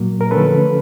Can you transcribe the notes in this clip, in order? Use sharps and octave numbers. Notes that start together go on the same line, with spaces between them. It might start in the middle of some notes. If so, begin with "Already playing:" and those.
Already playing: A#2 F#3 A#3
A#4
D3 F3 A3 C#4 A4 B4